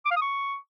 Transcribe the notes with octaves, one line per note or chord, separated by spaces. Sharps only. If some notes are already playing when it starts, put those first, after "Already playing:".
D6
F5
D#6
C#6